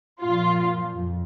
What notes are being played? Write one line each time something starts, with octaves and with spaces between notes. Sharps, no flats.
A#2 F3 F4
F2